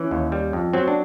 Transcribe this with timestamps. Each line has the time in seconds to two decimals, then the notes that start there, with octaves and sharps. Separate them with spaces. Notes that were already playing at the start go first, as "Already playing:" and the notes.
Already playing: E3 C#4
0.11 D#2
0.32 G3
0.53 F2
0.73 F#3 C4
0.88 D4